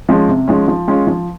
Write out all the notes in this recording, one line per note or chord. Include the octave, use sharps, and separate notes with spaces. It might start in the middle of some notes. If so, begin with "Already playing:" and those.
F3 G#3 C#4
C3
F3 G#3 C#4
F3
G#3 C#4 F4
F3